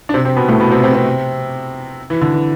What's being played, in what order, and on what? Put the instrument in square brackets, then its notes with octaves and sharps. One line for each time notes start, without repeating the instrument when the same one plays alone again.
[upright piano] D4
C3 C4
C3 C4
B2 B3
A2 A3
B2 B3
C3 C4
C3 C4
C3 C4
E3
D3
E3